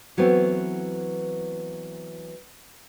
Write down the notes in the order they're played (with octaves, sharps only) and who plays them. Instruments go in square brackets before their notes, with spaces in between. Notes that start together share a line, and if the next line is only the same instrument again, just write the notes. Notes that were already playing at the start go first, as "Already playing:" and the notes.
[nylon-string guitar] E3 F#3 A3 B3 C4